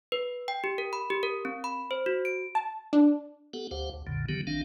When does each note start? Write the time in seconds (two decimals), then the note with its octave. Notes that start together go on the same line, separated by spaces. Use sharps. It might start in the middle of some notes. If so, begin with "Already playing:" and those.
0.12 B4
0.48 G5
0.64 G4
0.78 A#4
0.93 B5
1.10 G4
1.23 A#4
1.45 C4
1.64 B5
1.91 C5
2.06 F#4
2.25 D7
2.55 A5
2.93 D4
3.53 B3 G4 A4 F#5
3.71 D2 G4 C5 F5 F#5
3.94 D2
4.07 B1 F2 A#2 D3
4.29 D3 D#3 F#3 B3 G4
4.47 A1 D#3 C4 D4 F5